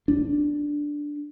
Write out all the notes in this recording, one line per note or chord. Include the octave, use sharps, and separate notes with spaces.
D4